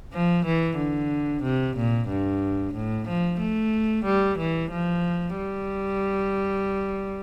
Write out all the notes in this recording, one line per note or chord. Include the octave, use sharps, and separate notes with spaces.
F3
E3
D3
C3
A#2
G2
A2
F3
A3
G3
E3
F3
G3